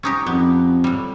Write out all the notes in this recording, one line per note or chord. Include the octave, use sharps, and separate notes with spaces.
C#4 D#4 G4
F2 B3
A2 G3